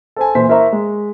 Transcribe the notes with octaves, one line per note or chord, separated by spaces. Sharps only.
A4 C5 G#5
A#2 E3 C5 B6
E4 A#4 C5 E5 A#5 C#6
G#3